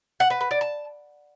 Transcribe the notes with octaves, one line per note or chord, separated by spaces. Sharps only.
F#5
B4
B4
D5
A5